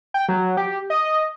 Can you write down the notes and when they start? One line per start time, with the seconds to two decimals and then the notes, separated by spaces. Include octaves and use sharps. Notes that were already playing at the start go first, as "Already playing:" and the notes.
0.14 G5
0.29 F#3
0.57 G4
0.90 D#5